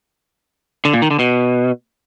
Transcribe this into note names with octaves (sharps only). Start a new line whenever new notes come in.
D3
A#2
D#3
D3
B2